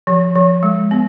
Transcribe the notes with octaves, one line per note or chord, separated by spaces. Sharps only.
F3
F3
G#3
B3